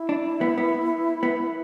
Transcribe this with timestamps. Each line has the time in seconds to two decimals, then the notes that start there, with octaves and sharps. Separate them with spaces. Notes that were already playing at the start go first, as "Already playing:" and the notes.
Already playing: E4
0.09 D4
0.41 B3
0.58 B3
1.23 B3